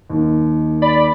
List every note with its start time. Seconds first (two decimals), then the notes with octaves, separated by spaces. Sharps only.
0.10 D#2 D#3
0.82 D5 B5